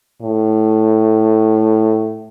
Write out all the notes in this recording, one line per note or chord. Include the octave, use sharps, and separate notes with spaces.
A2